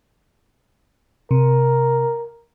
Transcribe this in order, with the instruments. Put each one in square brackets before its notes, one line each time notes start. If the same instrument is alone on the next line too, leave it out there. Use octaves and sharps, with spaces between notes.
[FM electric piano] C3 [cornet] A#4